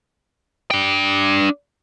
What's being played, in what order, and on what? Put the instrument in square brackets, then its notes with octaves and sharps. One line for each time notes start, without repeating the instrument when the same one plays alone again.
[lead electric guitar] D4 G5